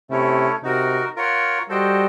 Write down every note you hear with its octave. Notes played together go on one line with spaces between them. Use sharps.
C3 A3 C#4 E4 A4 C#5
C3 D#4 F#4 A#4
F4 A#4 C#5 F#5
G3 F#4 A4 C5 D#5 G5